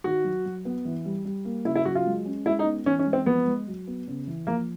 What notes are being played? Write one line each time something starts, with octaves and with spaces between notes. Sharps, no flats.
D#3 F#4
F#3
F#3
B3
E3
G3
G3
A#3
C#3 E4
E4
F#3 F#4
F4
G#3
C#4
G#3 E4
D#4
B3
E3 C#4
C#4
G#3
C4
F3 B3
G#3
F#3
B3
C#3
E3
F3 A#3